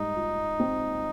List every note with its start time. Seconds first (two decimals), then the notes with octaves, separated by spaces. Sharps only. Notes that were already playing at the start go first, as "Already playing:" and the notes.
Already playing: G#2 G3 D#4
0.16 F4
0.60 C4